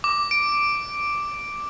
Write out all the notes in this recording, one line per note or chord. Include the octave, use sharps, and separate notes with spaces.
D6
D7